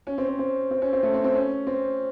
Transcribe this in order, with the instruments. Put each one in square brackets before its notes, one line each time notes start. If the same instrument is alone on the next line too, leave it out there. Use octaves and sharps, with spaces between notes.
[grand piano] C#4
C4
C4
C4
C4
C#4
C4
A3
C4
C4
C#4
C4